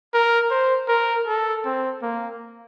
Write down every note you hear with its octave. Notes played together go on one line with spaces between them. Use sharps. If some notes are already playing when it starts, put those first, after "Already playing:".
A#4
C5
A#4
A4
C4
A#3